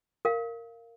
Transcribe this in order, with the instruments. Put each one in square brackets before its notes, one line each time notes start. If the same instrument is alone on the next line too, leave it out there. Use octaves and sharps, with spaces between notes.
[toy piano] A#4 F5